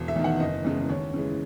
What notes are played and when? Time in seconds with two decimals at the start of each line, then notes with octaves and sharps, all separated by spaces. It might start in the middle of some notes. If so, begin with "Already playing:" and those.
Already playing: E1
0.08 E5
0.16 E2 D#3
0.24 F#5
0.40 F#1 D#5
0.65 E2 C#3 G#3
0.89 D#2 C#5
1.14 C#3 E3 G#3